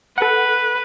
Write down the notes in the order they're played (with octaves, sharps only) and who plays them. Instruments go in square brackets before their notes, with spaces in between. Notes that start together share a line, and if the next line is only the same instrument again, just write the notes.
[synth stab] A4 F#5 [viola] B4